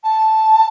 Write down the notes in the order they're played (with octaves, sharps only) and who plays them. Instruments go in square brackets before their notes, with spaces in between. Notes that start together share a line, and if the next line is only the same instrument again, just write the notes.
[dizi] A5